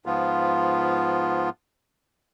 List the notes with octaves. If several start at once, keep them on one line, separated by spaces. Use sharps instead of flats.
G#2 F3 B3 F4